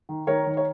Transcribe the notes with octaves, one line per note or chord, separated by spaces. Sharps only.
D#3
D#3 A#4 C#5
D#3
C#5